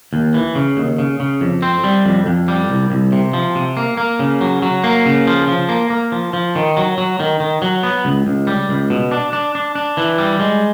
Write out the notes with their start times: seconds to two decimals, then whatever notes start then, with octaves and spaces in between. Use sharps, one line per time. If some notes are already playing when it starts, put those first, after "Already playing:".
0.13 D#2
0.34 E3
0.55 C#3
0.77 D#2
0.98 C#3
1.20 C#3
1.41 F2
1.62 C4
1.84 G3
2.05 F2
2.26 F2
2.48 G3
2.70 C2
2.90 C2
3.12 C3
3.33 F3
3.55 C3
3.77 A#3
3.97 A#3
4.19 C#3
4.41 F#3
4.62 F#3
4.84 A#3
5.06 C#3
5.27 F3
5.48 F3
5.69 A#3
5.90 A#3
6.12 F3
6.33 F3
6.56 D#3
6.77 F#3
6.98 F#3
7.20 D#3
7.40 D#3
7.62 F#3
7.83 B3
8.05 C#2
8.27 C#2
8.47 G3
8.69 C#2
8.90 B2
9.11 D4
9.33 D4
9.55 D4
9.75 D4
9.97 E3
10.18 G3
10.40 G#3